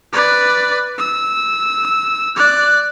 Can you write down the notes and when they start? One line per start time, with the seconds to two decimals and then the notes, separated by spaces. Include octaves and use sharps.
0.13 B4 D5
0.98 E6
2.36 D5 F#6